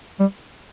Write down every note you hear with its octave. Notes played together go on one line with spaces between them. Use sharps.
G3